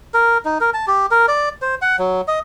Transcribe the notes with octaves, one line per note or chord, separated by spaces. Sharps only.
A#4
D#4
A#4
A5
G4
A#4
D5
C5
F#5
F#3
D#5